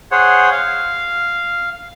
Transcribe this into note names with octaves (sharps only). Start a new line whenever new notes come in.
G#4 C5 C#5 F#5
F5